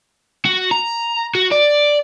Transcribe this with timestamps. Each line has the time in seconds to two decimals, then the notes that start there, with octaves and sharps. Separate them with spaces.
0.45 F#4
0.71 A#5
1.35 F#4
1.51 D5